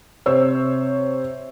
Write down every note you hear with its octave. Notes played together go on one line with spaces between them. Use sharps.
C3 C5 C#5 E6